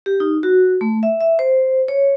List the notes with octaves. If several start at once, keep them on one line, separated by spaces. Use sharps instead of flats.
G4
D#4
F#4
A3
E5
E5
C5
C#5